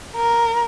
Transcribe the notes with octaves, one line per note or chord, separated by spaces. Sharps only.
A#4